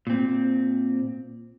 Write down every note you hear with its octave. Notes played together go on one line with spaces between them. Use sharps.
A#2 C4